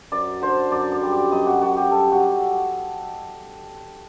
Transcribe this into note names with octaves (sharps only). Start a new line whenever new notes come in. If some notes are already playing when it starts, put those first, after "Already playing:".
F#2 D5
D3 C5
F#2 D5
D5
G3
D5
F#2 D#5
F#4
F#2 F#4
G4
G3 A4
F#4